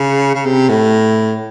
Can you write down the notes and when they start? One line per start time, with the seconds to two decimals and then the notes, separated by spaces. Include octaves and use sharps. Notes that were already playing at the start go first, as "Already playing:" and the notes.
Already playing: C#3
0.35 C#3
0.45 C3
0.69 A2